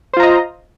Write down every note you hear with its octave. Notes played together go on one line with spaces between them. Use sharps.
F4 C5 D#5 A#5